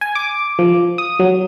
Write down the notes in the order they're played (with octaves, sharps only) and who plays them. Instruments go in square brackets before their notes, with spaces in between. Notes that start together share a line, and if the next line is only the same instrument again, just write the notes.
[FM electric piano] G#5
D6
F3
D#6
F#3